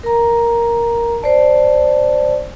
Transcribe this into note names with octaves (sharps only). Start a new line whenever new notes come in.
A#4 A#5
C5 D5 A5